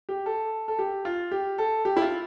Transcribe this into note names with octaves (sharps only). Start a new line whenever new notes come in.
G4
A4
A4
G4
F4
G4
A4
G4
E4
F4